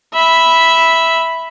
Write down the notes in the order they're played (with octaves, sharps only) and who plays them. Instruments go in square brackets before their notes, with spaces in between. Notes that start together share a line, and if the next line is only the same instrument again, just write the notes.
[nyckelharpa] E5 B5